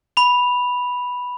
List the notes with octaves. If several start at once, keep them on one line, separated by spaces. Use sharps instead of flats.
B5 F7